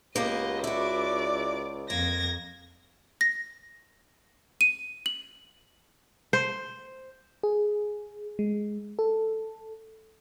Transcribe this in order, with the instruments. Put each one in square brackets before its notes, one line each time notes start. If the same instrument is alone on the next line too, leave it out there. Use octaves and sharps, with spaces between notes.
[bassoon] C#2 [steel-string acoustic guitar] A#3 B3 G4 [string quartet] D#5
[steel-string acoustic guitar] E4 F#4 [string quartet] D5 D6
[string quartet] F2 G#6 A#6 [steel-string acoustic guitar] A#3
[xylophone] A#6
D#7
F#7
[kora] C5
[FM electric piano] G#4
G#3
A4